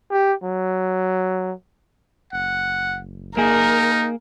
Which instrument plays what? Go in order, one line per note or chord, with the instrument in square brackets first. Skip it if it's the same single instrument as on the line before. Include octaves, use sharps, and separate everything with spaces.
[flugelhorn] G4
F#3
[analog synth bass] F#1 [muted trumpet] F#5
[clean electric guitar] A#3 G#4 [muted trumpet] D#4 [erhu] A#4